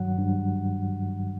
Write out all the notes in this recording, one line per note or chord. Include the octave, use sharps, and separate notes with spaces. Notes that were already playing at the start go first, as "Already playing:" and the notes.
Already playing: G2 D#3 F#3 F#5
G2